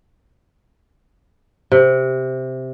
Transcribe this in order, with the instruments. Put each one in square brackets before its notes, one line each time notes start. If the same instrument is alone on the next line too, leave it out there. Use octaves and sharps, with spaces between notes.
[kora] C3